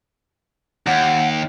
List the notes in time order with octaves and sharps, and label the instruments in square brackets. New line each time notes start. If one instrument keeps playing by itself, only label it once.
[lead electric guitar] D#2 [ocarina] F#5